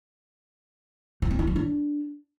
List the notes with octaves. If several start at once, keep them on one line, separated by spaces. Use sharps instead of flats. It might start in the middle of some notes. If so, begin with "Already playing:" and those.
F3
C4
D#4
F#3
D4